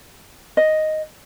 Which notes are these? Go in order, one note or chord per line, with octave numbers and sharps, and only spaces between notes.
D#5